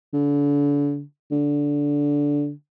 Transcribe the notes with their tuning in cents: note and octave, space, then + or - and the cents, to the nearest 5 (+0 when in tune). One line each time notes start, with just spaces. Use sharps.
D3 -35
D3 -15